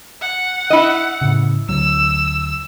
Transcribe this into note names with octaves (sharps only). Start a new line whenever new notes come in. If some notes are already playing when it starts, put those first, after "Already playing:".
F#5
E4 D#5
A2 C#3
D2 F#3 E6